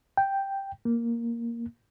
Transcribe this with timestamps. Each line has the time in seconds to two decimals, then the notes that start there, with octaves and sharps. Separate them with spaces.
0.17 G5
0.85 A#3